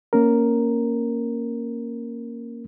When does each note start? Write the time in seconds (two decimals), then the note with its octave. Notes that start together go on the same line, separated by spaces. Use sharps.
0.13 A#3 C#4 A#4